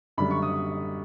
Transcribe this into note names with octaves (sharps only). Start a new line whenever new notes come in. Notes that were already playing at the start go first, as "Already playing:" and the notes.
F#2 D3 G3 B5
C#6
D#6